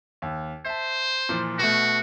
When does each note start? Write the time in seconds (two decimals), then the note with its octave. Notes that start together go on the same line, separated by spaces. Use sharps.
0.22 D#2
0.66 C5 E5 A5
1.29 A#2 E3 F3
1.59 B2 A3 F#4